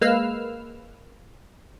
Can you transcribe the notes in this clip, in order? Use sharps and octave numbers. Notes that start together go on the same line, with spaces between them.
G#3 A#3 B4 F5 E6 F6